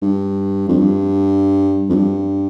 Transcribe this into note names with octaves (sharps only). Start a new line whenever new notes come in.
G2
F2
G2
F2
G2